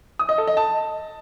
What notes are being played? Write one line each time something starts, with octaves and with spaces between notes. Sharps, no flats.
D#6
D#5
A4
D#5
A5